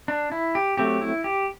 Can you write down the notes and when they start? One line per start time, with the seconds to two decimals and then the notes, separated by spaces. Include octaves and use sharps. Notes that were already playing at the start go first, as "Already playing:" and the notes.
0.08 D4
0.32 E4
0.55 G4
0.77 F#3 A3 C4 G4
1.01 E4
1.24 G4